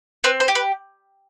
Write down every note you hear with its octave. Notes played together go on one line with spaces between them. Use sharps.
C4 B4
C5
G4
B4